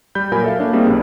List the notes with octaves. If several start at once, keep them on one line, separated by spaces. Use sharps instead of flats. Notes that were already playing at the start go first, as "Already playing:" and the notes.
G3 B5 G6
A#2 F#3 A#4 G#5 B5 G6
A4 E5 F5
A#3 D4 C#5
G3 A#3 C4 C#4 D#4 G#4
B1 G2